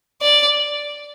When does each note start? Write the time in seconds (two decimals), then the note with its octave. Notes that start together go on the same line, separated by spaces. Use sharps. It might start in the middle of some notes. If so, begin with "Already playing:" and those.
0.22 D5